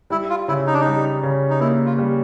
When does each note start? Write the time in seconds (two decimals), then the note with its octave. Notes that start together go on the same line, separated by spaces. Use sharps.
0.10 G3 E4
0.30 F4
0.48 C#3 E4
0.67 D#4
0.74 D4
0.81 G3 D#4
1.23 C#3
1.50 D#4
1.60 A#3 E4
1.86 F4
1.98 G3